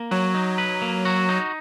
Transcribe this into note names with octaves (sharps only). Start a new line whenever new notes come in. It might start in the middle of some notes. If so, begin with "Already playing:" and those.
Already playing: A#3
F#3 F#4
D#4
B4
A#3
F#4
D#4